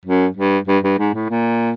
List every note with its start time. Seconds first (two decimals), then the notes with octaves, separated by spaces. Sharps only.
0.05 F#2
0.36 G2
0.67 G2
0.83 G2
0.98 G#2
1.14 A2
1.29 A#2